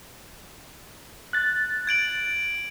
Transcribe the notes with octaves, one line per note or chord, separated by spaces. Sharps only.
F#6 A6
G#6 D7 F#7